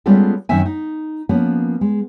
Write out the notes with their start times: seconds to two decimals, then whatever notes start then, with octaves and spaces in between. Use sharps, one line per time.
0.06 G3 G#3 B3 C#4 F4 A4
0.49 F#2 D#3 C4 C#4 E5 G#5
0.65 D#4
1.29 F3 A#3 B3 C#4
1.81 G#3